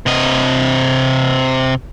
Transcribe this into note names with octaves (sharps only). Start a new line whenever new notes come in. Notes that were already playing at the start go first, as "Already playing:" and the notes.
C3 D#5